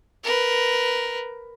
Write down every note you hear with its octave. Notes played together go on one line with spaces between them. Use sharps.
A#4 B4